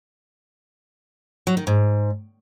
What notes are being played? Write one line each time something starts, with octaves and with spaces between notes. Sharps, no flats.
F#3
D#3
G#2